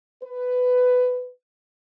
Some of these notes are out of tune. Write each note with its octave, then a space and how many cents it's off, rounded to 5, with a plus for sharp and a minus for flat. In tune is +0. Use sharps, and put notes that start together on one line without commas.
B4 +15